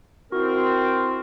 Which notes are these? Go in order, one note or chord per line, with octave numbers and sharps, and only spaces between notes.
C4 E4 F#4 A#4